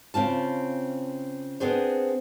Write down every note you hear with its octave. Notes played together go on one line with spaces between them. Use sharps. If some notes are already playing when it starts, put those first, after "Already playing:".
C#3 C4 F4 A5
B3 C4 D4 G#4 C5